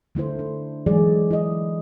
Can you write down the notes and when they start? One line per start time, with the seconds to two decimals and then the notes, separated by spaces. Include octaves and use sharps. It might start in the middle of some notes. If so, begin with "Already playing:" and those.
0.15 D3 A3 E4 C5
0.39 D4
0.86 E3 F#3 G#3 G#4 D5
1.31 E4 D#5